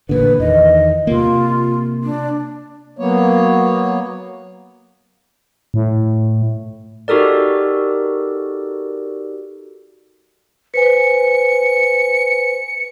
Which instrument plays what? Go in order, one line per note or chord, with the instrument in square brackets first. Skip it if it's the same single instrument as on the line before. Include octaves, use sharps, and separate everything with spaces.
[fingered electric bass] A1 A#2 D3 [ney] B4
[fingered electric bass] E2 D#3 [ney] D#5
[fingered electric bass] C3 A#3 [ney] F4
[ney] D4
[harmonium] F#3 A#3 B3 C#5
[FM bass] A2
[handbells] D#4 F#4 G4 A4 A#4 D5
[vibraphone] B4 C5 G#5 [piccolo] C#7